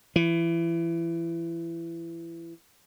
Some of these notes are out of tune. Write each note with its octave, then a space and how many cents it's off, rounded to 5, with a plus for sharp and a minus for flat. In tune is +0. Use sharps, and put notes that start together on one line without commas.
E3 +25